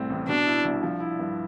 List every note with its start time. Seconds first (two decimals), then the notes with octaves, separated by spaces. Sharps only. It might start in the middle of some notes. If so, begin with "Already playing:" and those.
Already playing: C2 A2 C4
0.10 A1
0.28 B2 D4
0.47 E4
0.65 C2
0.83 F3
1.00 E4
1.19 G2